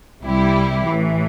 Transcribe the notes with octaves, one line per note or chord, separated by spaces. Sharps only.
C2 C3 G3 E4 G4
A1 A2 E3